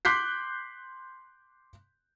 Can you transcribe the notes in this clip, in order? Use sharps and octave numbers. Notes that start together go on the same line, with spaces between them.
C6 D6 F#6 G6 B6 C7